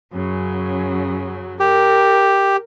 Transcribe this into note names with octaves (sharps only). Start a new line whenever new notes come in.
F#2 C#3 F#3
G4 A#4